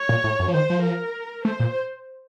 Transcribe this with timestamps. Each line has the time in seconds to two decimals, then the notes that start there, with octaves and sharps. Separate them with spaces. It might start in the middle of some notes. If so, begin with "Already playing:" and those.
Already playing: C#5
0.09 A#2
0.24 A2
0.39 F#2
0.48 F3
0.54 D#3 C5
0.70 F3
0.85 A#4
1.45 A3 C5
1.60 A#2